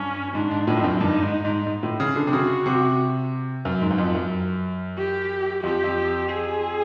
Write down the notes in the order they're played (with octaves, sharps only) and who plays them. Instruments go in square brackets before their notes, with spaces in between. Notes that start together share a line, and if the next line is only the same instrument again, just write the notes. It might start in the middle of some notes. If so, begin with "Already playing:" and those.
Already playing: [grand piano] G2 [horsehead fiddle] C#4
[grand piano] G#2 [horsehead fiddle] D4
[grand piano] G#2
A2
F2
F#2
[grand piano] G2 [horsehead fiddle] D#4
[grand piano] G#2
G#2
G#2
A2
C#3
D3
C3
[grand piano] C#3 [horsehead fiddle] F#4
[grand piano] C3
F#2
G#2
F#2
F2
F#2
[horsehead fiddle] G4
[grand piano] F2 [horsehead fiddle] G4
[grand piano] F2
[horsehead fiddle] G#4